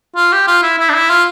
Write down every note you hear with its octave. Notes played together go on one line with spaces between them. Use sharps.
F4
G4
F4
E4
E4
D4
E4
F4